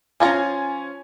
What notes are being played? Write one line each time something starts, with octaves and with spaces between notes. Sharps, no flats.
F3 C#4 F4 G#5 A#5